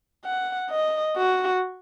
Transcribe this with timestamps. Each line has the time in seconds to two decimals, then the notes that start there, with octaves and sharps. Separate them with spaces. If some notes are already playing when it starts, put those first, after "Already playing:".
0.25 F#5
0.70 D#5
1.17 F#4